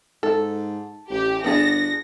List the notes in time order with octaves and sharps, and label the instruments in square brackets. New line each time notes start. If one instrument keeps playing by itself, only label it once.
[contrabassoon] G#2 [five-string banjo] A4
[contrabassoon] A1 [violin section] G4
[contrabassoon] G1 [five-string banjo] B3 D4 G#4 [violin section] A#6